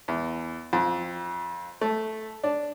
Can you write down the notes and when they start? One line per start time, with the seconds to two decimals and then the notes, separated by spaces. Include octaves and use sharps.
0.08 E2
0.73 F2
1.81 A3
2.44 D4